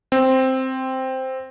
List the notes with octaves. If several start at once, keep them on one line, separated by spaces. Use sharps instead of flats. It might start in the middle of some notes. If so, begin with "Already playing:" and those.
C4